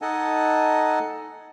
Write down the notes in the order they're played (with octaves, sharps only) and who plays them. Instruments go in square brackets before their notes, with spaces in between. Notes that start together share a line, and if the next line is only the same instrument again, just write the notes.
[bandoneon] D#4 A4 D#5 F#5 G#5 A5